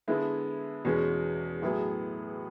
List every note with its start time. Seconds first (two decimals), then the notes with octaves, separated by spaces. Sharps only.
0.08 D3 G#3 B3 E4
0.85 E2 B2 G#3 C#4
1.62 A2 F#3 B3 E4 G#4